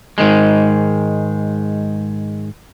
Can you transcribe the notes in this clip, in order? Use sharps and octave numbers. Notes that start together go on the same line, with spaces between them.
G#2 D#3 G#3